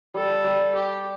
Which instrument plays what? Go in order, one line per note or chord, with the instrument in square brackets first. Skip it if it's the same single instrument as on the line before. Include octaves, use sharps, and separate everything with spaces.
[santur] G3 [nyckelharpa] A4
[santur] G3
[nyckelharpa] G4